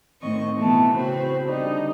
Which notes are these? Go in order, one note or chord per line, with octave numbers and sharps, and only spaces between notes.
A2 D#3 C4 D#5 C#6
B2 E3 A3 B3
C#3 C4 F#4 B5
D3 G3 D#4